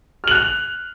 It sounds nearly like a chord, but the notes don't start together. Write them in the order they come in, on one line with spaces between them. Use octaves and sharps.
F6 F#7 F#6 F7